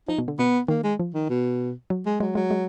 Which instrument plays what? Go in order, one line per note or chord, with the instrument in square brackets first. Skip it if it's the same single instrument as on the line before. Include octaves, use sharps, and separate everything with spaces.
[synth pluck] F3 [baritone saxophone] D#4
[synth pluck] B2
D3
[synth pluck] B2 [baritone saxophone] B3
[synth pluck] D#3 [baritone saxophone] A#3
[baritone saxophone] G#3
[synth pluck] F3
[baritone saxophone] D#3
B2
[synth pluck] F#3
[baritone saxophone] G#3
[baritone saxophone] F#3 [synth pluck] G#3
[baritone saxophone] F#3 [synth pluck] G#3
[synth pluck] G#3